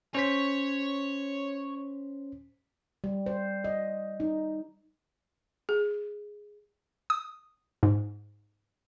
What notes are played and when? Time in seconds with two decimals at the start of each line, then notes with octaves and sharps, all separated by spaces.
0.15 C#4 C5 C#5 B6
3.04 G3
3.26 C5
3.64 D#5
4.20 D#4
5.69 G#4
7.10 D#6
7.83 G#2